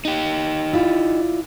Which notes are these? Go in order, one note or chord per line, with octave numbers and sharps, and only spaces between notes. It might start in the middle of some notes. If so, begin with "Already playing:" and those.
D#4 G4
E4 F4 D5